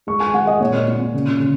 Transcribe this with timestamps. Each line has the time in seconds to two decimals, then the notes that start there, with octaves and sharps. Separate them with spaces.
0.07 G#3 C#6
0.20 G#5
0.34 G#3 F#5
0.47 D#5
0.60 A#2 C#5
0.88 A#2
1.14 C#3
1.40 C#3